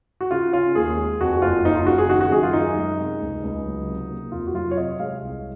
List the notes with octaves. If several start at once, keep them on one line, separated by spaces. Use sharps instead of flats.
F#4
C#3 F4
C#4 F4
D#2 G#4
G#3
F2 F#4
F#1 F4
F#1 D#4
F4
C#3 F#4
G#4
D#3 F#4
F#4
F#2 G#4
F4
F#2 D#4
G#3
C3
C#2
C#2
F#3
C3
A#3
F2 F4
F#4
F#3 F4
C#5
C3 D#5
G#3 F5
C2